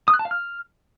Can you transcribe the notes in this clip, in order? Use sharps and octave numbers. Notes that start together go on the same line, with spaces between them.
D#6
F#6
A5
F5
F6